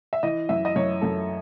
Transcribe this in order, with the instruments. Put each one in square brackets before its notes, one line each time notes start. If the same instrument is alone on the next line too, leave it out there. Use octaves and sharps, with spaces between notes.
[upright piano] E5
E3 D#5
F#2 E5
D#5
F#2 C#5
F#2 A4